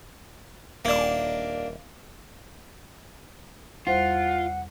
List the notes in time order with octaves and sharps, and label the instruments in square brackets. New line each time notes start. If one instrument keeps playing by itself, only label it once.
[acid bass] D#1 [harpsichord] A#3 D4
[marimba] E2 G3 C5 [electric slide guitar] F4 [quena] F#5